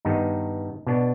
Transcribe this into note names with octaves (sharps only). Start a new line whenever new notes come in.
G2 D#3 B3 D#4
B2 B3 D4